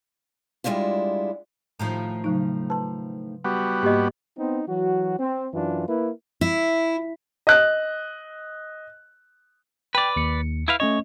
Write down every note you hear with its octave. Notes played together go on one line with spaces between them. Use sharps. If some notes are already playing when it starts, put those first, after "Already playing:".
G3 G#3 D4 E4 F4
A2 D#3 F3
C#3 F#3 D#4
B4 A5 C6
G3 B3 F#4
G#2 A#3 G4 D#5
B3 C4 D#4
E3 F#3 F#4
C4
F#2 E3 D4 F4
A#3 E4 A#4 B4
E4
D#5 F#6
B4 D5 G5
D#2 C#7
E4 B4 F5
A3 C#4 C#5 D#5